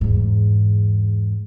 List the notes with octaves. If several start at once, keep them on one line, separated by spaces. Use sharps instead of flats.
E2 G#2